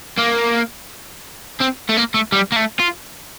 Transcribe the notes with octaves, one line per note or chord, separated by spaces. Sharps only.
A#3
C4
A3
A#3
A3
G3
A#3
A3
F4